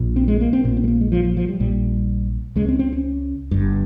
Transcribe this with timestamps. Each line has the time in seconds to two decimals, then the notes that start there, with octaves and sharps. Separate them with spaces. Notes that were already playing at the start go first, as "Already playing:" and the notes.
Already playing: A#1 A#2
0.16 C4
0.28 G#3
0.41 A#3
0.53 C4
0.64 A#1 A#2 C4
0.77 C4
0.84 G#3
0.88 A#3
1.01 G#3
1.12 F3
1.25 F3
1.37 F3
1.49 G3
1.60 A#1 A#2 G3
2.56 C#2 C#3 G#3
2.69 C4
2.79 C4
2.92 C#4
3.51 G1 G2